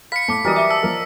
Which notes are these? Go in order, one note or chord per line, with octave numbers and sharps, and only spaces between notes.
F5 B5 B6 C#7
A2 A5 D6
E3 F#3 G3 A#4 D5 D#5
E5 D6
A5 E6
F3 A#4